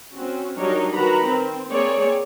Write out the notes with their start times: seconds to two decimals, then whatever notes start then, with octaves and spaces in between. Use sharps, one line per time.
0.14 C4 C#4 F#4
0.58 F#3 G3 D4 D#4 A#4 C#5
0.94 D#3 F#4 A#4 B4 A#5 B5
1.28 C4
1.71 A#3 C4 G#4 C#5 D5